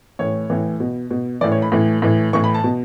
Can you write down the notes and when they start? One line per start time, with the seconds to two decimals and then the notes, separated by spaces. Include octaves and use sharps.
0.19 A2 E3 C#5
0.50 A2 E3
0.80 B2
1.11 B2
1.41 A2 E3 D5
1.52 C#5
1.62 B5
1.72 A2 E3
2.02 A2 E3
2.33 A2 E3 C#6
2.44 B5
2.54 A5
2.64 B2